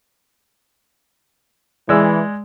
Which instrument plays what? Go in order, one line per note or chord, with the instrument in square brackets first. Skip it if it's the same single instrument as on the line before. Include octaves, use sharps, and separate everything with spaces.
[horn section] E3 [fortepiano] G#3 D5 E6